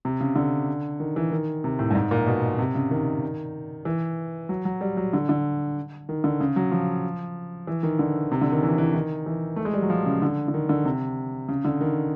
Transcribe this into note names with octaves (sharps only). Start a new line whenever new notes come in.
C3
C#3
D3
D#3
E3
D#3
C3
A2
G2
G#2
A#2
B2
C3
C#3
D#3
E3
F#3
F#3
G3
F#3
D3
D3
D#3
D3
C#3
F#3
F3
E3
D#3
D3
C3
D3
D#3
E3
E3
D#3
E3
A3
G#3
G3
F#3
F3
C#3
D3
D3
D#3
D3
C3
C#3
D3
D#3